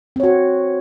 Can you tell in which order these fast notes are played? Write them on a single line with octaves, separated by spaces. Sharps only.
C4 C#5 F#4